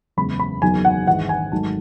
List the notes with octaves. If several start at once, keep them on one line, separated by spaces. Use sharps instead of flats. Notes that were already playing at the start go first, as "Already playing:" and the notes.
F#1 E2 C#3 G#3 B5
B5
F#1 E2 D#3 F#3 G#5
F#5
G#1 G#2 E3 F#5
G#5
G#1 G#2 D#3 F#3 A3 A5